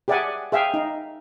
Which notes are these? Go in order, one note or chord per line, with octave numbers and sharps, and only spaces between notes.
G4 G#4 D5 E5 F#5 G#5
G#4 E5 F5 G5
D#4